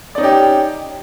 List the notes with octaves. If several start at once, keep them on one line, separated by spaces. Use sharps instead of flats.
C#4 D#4 G4 D5